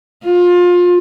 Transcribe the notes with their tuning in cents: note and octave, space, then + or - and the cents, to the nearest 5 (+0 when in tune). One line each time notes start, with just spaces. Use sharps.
F4 +25